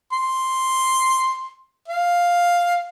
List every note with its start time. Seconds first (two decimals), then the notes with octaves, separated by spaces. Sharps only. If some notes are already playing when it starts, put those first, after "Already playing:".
0.13 C6
1.88 F5